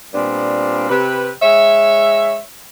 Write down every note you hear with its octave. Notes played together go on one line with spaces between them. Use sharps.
A#2 G3 B3 C4 D4
C3 B4
G#3 C#5 E5